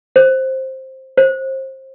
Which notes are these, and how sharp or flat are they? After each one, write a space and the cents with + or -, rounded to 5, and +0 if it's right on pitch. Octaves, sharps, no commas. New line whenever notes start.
C5 +10
C5 +25